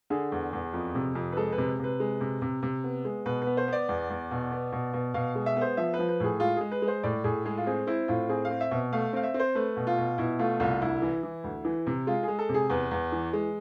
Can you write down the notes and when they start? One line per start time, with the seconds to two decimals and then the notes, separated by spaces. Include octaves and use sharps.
0.10 D3 G#4
0.32 E2
0.53 E2
0.73 F2
0.95 C3
1.15 F2
1.32 B4
1.37 G#3 A4
1.52 B4
1.58 C3
1.79 C3 B4
2.00 G#3
2.21 C3
2.42 C3
2.63 C3
2.84 B3
3.05 G#3
3.26 B2 B4
3.42 B4
3.47 B3
3.57 C5
3.68 B3 D5
3.89 E2
4.10 E2
4.31 B2
4.52 B3
4.72 B2
4.93 B2
5.14 B2 F5
5.35 G#3
5.46 E5
5.56 B3 C5
5.77 F3 E5
5.94 B4
5.99 F3
6.09 B4
6.20 A2 G#4
6.40 G#3 F4
6.57 G#3 G#4
6.72 B4
6.82 G#3
6.88 C5
7.03 A2 D5
7.24 A2 G#4
7.45 G#3 G#4
7.57 F4
7.67 C4 G#4
7.87 C4 E4
8.08 A2 F4
8.29 C4 G#4
8.45 F5
8.50 C4
8.61 E5
8.71 B2
8.93 A3 F5
9.13 C4 F5
9.23 E5
9.34 C4
9.39 C5
9.55 A3 B4
9.77 B2
9.87 F4
9.98 B2
10.18 B2 E4
10.39 A3 F4
10.60 C2 F4
10.81 D2 E4
11.02 E3
11.23 E3
11.44 D2
11.65 E3
11.87 C3
12.07 G#3 F4
12.23 G#3 G#4
12.39 A4
12.49 C3
12.54 G#4
12.70 E2 B4
12.91 E2
13.12 E3
13.33 G#3